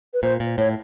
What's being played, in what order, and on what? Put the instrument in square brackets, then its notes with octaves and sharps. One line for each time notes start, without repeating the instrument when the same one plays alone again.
[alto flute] B4
[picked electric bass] A#2 [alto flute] C5
[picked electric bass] A#2
[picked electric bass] A2 [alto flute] C#5